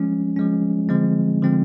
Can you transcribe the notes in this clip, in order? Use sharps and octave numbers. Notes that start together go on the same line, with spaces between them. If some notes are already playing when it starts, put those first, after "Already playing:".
Already playing: F3 G#3 C#4
F3 G#3 C#4
D3 F3 G#3 C4
D3 F3 G#3 C4